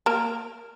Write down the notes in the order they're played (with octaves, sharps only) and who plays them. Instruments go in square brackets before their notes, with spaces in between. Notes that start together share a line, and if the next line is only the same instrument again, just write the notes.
[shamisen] A#3 A#4